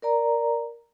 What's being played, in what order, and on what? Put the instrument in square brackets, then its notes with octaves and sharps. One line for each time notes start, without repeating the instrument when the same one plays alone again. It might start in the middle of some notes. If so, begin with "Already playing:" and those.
[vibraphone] A#4 D5 A#5